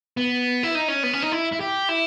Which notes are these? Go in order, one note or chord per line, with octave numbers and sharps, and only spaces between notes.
B3
E4
D#4
C#4
B3
C#4
D#4
E4
E4
G4
E4